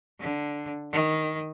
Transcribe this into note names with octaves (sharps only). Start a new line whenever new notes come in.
D3
D#3